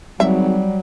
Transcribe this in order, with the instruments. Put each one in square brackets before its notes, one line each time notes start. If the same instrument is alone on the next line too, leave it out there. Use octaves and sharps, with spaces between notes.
[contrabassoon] G#1 [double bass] F#3 [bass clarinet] G3 [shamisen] E5